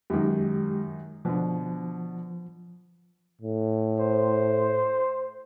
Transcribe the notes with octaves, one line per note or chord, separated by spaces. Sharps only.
F#2 D#3 G#3 G4
B2 D3 F3
A2
C5